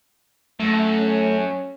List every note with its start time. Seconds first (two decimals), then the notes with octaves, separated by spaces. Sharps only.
0.60 F#2 A3
0.99 C#4